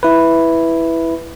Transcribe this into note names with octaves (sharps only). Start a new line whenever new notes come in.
E4 B4